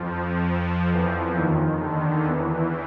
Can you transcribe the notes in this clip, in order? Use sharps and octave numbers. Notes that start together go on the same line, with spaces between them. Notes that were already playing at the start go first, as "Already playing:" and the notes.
Already playing: F2 F3
E2 E3
D#2 D#3
D3
E2 E3